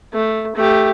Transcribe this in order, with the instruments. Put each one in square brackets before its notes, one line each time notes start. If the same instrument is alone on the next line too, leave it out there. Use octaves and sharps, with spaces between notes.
[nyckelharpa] A3
A3 G4